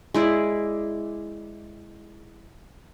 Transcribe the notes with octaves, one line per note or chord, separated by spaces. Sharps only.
G#3 E4 D5